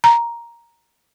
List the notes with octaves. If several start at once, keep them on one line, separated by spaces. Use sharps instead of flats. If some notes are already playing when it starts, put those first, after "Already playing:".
A#5